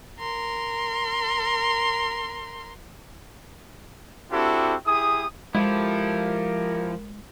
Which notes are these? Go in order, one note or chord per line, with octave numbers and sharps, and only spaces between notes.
A#4 C6
C4 D4 E4 F#4 G4 A4
E4 G4 G#4 D#6
F3 G#3 E4 G4 A4 A#4